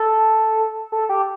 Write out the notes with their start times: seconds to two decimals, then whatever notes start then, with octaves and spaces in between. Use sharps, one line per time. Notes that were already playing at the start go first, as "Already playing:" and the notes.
Already playing: A4
0.92 A4
1.09 G4